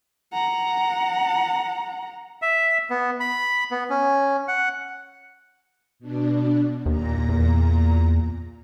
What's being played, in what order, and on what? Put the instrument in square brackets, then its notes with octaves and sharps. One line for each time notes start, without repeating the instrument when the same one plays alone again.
[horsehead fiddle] F#5 A#5
[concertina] E5
B3
B5
B3
C#4
F#5
[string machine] B2 D4
[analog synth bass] D#2 [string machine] A#2 A#5
[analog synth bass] E2